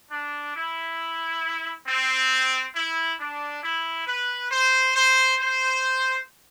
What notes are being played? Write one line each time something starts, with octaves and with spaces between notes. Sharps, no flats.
D4
E4
C4
E4
D4
E4
B4
C5
C5
C5